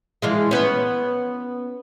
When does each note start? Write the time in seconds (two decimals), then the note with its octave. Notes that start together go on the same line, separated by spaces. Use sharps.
0.22 E3 F3 G#3
0.51 B3 C#4